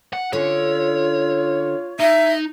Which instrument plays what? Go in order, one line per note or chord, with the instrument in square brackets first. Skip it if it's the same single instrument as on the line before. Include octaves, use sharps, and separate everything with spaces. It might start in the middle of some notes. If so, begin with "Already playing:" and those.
[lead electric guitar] F#5
[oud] D3 C#4 [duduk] F4 [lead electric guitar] C#5
[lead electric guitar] D#4 [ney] E5